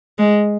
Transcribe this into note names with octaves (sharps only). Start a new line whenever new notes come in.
G#3